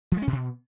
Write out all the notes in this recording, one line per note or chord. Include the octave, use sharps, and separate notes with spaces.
F3
G#3
C#4
A#2
B2